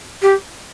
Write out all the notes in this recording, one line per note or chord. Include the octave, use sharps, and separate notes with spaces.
G4